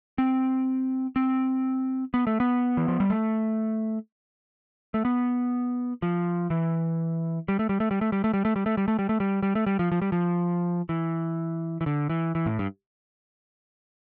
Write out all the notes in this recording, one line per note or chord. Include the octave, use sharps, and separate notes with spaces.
C4
C4
B3
A3
B3
E3
F3
G3
A3
A3
B3
F3
E3
G3
A3
G3
A3
G3
A3
G3
A3
G3
A3
G3
A3
G3
A3
G3
A3
G3
G3
A3
G3
F3
F3
G3
F3
E3
E3
D3
E3
E3
A2
G2